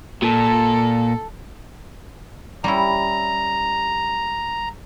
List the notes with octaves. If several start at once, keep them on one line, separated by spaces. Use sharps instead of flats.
A#2 A4
G3 C#4 E4 A#5